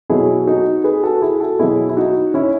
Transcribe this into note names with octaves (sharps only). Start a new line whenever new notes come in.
B2 F#3 E4 G#4
D#4 F#4
G#4 B4
F#4 A4
E4 G#4
F#4 A4
B2 F#3 E4 G#4
E4
D#4 F#4
C#4 E4